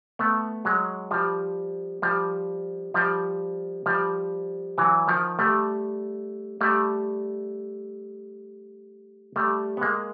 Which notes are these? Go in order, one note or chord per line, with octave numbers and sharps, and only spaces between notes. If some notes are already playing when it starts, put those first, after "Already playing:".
A3 B3
F#3 G#3
F3 G3
F3 G3
F3 G3
F3 G3
E3 F#3
D#3 F3
G3 A3
G3 A3
G3 A3
B3
G#3 A#3